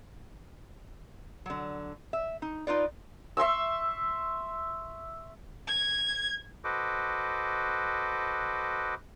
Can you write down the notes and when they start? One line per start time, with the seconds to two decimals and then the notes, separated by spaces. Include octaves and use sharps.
1.46 D3 F#3
2.13 E5
2.42 D#4
2.67 D#4 F4 B4 D5
3.37 E5 C6 C#6 E6
5.68 G#6
6.64 F#4 A4 B4 C5 D#5 D6